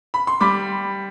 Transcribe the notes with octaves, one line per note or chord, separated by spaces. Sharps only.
B5
C6
G3 B5 D6